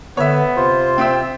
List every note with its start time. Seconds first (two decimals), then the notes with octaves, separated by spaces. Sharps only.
0.17 D3 B3 C#5 E5
0.57 C3 F4 C5
0.98 C4 E5 G5 E6